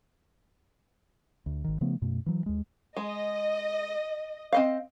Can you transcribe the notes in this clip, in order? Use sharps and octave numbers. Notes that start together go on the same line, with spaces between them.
D2
G#1 D#3
C#3 F3 A3 B3
F#2 B2 A3
E3 F#3
D#2 G#3
G#3 D#5
C4 D#5 F5